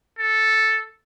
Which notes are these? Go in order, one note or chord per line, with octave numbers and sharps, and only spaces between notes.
A4